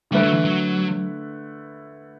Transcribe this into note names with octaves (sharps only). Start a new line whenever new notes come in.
D3 G3 A3 E4 B4
F#3
E3
F#3